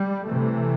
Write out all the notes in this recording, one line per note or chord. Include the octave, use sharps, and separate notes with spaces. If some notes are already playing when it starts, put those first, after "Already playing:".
Already playing: G3
C3 E3 A3